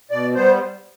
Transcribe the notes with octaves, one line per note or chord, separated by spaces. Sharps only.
B2 D5
G3 B3 C5